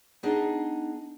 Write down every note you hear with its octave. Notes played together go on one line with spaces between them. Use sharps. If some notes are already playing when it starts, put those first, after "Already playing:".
B3 D4 D#4 G#4 D#5